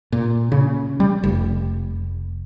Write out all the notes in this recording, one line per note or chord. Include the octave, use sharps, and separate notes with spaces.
A#2
C#3
G3
F1